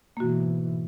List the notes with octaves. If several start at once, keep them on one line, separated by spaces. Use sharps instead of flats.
G#2 B2 E3 A#3 F#4